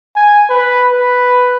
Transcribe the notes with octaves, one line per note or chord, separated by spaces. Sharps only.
G#5
B4
B4